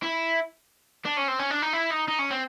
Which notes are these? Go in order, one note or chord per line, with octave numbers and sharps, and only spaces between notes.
E4
D4
C#4
C4
C#4
D4
D#4
E4
D#4
D#4
C#4
C4